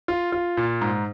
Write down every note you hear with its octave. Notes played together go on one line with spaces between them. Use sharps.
F4
F4
A#2
G#2